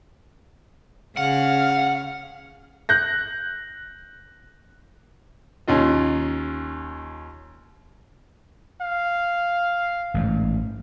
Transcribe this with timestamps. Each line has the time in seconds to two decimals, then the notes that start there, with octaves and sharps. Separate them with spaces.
1.17 C#3 F5 F#5
2.89 F#6 G6 A#6
5.68 D#2 C#4 F4 D#5
8.81 F5
10.14 A1 G#2